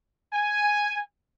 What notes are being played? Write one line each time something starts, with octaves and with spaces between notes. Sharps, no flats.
G#5